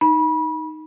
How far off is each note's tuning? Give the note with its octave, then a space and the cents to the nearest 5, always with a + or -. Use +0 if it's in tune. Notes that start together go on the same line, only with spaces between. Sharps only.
D#4 +0 B5 -30